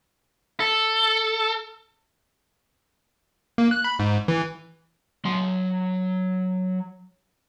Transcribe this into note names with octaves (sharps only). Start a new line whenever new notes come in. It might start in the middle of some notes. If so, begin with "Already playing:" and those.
A4
A#3
F#6
B5
G#2
E3
F#3 C6